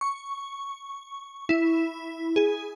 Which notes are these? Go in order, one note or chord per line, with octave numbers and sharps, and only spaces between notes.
C#6
E4
G#4